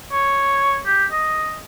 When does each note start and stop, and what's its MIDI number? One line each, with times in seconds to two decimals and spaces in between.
0.13 0.79 73
0.87 1.05 67
1.12 1.58 75